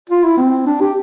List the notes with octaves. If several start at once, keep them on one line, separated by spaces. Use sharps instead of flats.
F4
E4
C4
D4
G4